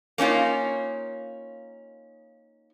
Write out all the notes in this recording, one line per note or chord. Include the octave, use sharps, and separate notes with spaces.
A#3 C#4 D#4 F4